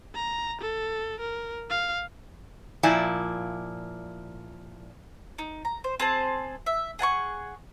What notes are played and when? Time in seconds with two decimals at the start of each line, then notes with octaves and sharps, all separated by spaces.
0.15 A#5
0.62 A4
1.21 A#4
1.70 F5
2.83 A#2 F3 E4 D5 G#5
5.39 D#4
5.65 A#5
5.84 C5
6.00 C4 G#4 C5 A5
6.66 E5
6.99 G#4 F#5 A5 C#6